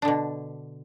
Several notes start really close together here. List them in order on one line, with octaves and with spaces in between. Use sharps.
D4 D3 B2